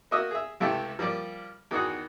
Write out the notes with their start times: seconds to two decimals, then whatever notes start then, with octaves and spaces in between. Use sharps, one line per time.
0.11 A#3 F#4 D#5 E5
0.31 G#4 E5
0.60 C#2 C3 A3 E4 G4 A5
0.99 F3 G3 A#3 D5
1.71 E2 D#3 D#4 F#4 G#4